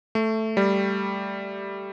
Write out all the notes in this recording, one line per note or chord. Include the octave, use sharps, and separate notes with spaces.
A3
G3